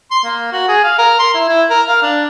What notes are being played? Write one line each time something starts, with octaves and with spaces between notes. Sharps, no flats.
C6
A#3
F#4
G#4
F5
A#4
C6
E4
E4
A#4
F5
D4